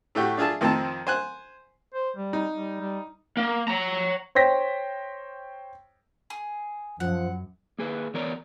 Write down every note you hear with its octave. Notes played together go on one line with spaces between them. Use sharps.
A2 A3 F#4 G4
D4 F4 G#4 E5 A5
F2 D#3 F3 C4 A5
C5 G#5 F#6
C5
G3
D#4
G3
G3
A#3
C#5 A#5
C5 C#5 G5 A#6 B6
G#4
F#2 F3 F#5
A#3 G#4 B4
E3 B3 A#4 C#5 D5 A#5